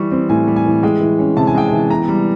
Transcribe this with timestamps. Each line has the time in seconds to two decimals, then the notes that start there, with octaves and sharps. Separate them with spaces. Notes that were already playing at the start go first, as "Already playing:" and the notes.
Already playing: E3 G3 C#6
0.12 C4
0.29 A2 G#5
0.47 G3
0.56 G#5
0.65 E3
0.83 G#3 G5
1.01 E3
1.19 C#4
1.37 C3 A5
1.47 G#5
1.55 G#3 G5
1.68 G#5
1.73 E3
1.90 B3 A#5
2.08 G3